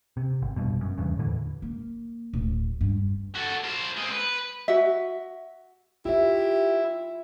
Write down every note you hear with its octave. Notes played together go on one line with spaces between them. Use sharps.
C3
G#1
F1 G2 B2
F#2
E2 G2 C#3
E2 A2 D3 E3
A#3
D1
G2
F#4 A4
A#4 C5
G#3 C4
B4
F#4 E5
E4 F4 G4 E5